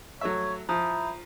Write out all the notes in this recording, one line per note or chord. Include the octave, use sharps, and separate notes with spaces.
F#3 A3 C#5 E5
F3 E4 A#5 D#6 G6